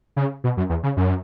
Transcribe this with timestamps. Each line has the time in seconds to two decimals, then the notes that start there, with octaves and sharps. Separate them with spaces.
0.17 C#3
0.44 B2
0.57 F#2
0.69 E2
0.83 C#3
0.97 F#2